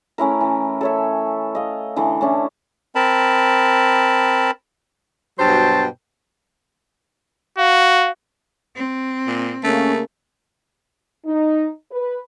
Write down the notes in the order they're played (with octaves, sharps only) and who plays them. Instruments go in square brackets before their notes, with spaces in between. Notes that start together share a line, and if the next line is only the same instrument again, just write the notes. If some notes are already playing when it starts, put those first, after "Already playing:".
[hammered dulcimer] A3 C#4 E4 A#4
E3
A4 C#5 E5
D#5 F5
D3 E3 A3
A3 C#4 D4 E4
[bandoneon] C4 A#4 A5 B5
[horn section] G2 B2 F#3 C5 G5 A5
[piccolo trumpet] F#4 [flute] F5
[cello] C4
[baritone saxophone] A#2
[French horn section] C#3 A#3 [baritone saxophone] A3 [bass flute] C#4
[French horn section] D#4
B4